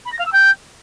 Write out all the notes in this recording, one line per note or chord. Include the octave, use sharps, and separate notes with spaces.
B5
A#6
F5
E6
G5